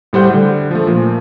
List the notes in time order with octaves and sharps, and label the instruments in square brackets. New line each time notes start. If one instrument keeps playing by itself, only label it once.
[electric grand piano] A2 G3 C5 F#5 G6
D3 G3
F3 A3
A#2 F3